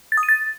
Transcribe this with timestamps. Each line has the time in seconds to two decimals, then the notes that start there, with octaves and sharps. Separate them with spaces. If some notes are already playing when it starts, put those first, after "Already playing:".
0.12 A6
0.17 D#6
0.23 D#7
0.29 A6